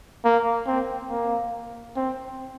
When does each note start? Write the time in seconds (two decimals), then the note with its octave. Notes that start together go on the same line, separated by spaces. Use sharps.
0.25 A#3
0.67 C4
1.10 A#3
1.96 C4